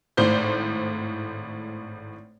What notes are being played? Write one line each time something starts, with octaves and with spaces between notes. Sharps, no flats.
G#1 A2 C5 G6